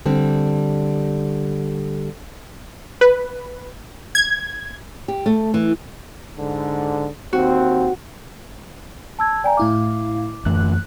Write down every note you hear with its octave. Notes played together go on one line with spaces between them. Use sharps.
D3 G3 C4
B4
G#6
G4
A3
E3
G#2 D3
D#2 C4 F#4
A5 E6 G#6
D5 G5 G#5 A#5
A2 E4 F5 D6
F#2 E3 A3 F#6